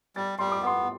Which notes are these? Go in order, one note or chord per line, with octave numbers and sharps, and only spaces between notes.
G3 A6
G3 C6
D6
B3 C6